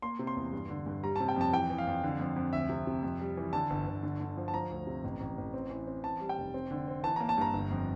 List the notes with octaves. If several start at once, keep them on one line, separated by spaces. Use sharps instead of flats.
A#3 C6
C3
C6
E2
G2
D3
G2
G3 A#5
A5
C3
G5
F2 A5
E3 G5
E3
F5
F2
D3
F2
F2
D2 E5
C3
C3
F2
G3
E3
D3 A5
G1
G1
D3
D3
F3
A5
F3 A#5
D2
C3
A1
A1
A1
C4
E3
C4
E3 A5
G3
G5
F1
C4
D3
C4
E3 A5
A#5
A#3
A5
G2 A#5
G1
F2